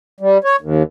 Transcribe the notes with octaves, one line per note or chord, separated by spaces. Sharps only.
G3
C#5
D#2